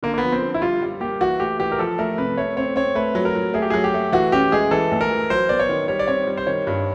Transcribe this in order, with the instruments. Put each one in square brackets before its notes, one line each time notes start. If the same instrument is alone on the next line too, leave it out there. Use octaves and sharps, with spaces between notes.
[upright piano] D3 [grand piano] A#3
[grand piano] A#3
B3
[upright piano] F3
[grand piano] C4
[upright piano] D3
[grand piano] E4
[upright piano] G3 [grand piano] F4
[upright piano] G3
[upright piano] A#3 [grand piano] G4
[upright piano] E3 [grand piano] F#4
[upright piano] A3 [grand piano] G4
[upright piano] E3 [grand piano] G4
[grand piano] A#4
[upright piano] F3 [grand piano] A4
[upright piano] A3 [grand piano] A#4
[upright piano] C3 [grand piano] B4
[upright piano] A3 [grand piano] C#5
[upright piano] C4 [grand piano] C#5
[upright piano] C4 [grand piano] C#5
[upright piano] A3 [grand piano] B4
[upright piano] F#3
[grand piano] A#4
[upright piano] F#3
[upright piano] A3 [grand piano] G#4
[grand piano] G4
[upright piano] F#3 [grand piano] G#4
[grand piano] G4
[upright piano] A3
[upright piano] E3 [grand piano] F#4
[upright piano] C#4 [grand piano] G4
[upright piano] G#3 [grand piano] G#4
[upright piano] E3 [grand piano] A4
[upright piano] D2
[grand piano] A#4
[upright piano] E3
[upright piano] F#3 [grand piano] C5
[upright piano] B3 [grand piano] D5
[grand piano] C#5
[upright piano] D#3
[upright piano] G3 [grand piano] C#5
[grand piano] D5
[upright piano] C4 [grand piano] C#5
[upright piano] G3
[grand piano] C5
[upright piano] D#3 [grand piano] C#5
[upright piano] G2